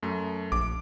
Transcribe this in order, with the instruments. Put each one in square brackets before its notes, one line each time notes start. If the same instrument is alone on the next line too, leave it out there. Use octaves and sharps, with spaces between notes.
[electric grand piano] F#2 A3
[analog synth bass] A#1 [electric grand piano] D6